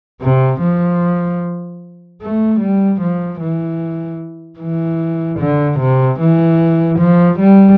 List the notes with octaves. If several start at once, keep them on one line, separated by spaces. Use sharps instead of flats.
C3
F3
A3
G3
F3
E3
E3
D3
C3
E3
F3
G3